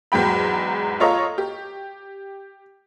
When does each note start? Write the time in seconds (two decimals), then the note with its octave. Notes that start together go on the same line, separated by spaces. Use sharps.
0.12 E2 G#2 F#3 G5 B5
1.00 F4 A4 C#5 D#5 A#5
1.38 G4